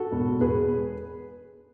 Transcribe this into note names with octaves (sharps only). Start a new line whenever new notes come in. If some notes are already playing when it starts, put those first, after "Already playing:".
Already playing: F#4 A4
E1
E1 G#4 B4